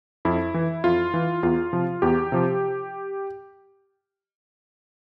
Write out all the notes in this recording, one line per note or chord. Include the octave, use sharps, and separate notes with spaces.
F2 E4
E3
F2 F4
E3
E2 F4
C3 F3
E2 G4
C3 F3